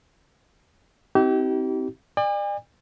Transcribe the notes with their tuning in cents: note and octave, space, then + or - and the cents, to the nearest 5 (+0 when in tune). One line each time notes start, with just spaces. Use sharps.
C4 +0 D#4 +45 G4 -35
D5 +35 G#5 -45